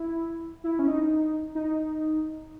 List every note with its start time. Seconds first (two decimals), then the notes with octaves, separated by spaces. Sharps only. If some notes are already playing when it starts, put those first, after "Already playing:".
Already playing: E4
0.64 E4
0.79 C#4
0.88 D#4
1.55 D#4